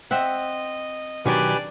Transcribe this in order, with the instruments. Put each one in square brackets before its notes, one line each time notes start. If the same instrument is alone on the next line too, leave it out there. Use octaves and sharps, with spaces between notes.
[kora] C4 E5 F#5 [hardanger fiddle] D#5
[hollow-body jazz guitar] B2 D#3 F#3 [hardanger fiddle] D4 D5 [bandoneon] G4 B4 G#5